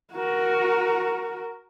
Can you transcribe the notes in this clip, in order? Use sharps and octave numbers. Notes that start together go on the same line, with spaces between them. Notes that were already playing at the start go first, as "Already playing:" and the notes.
F#4 A#4